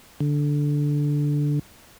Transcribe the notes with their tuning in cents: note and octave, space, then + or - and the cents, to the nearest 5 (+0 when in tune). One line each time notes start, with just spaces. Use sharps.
D3 -5